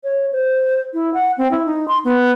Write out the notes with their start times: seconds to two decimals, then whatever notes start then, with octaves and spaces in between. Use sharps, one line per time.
0.04 C#5
0.33 C5
0.94 E4
1.14 F#5
1.38 C4
1.51 E4
1.66 D#4
1.88 C6
2.05 B3